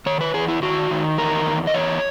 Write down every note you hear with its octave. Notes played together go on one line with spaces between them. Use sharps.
D#3 C#5
B4
E2 G#4
E4
D#3 F#4
D#3
E2 A#4
E2
D#5
E2 C#5